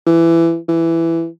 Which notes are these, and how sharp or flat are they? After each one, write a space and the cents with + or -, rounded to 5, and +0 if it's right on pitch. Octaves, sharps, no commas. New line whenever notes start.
E3 +20
E3 +10